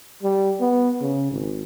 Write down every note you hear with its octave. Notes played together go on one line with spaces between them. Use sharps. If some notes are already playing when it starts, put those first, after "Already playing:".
G3
B3
C#3
G#1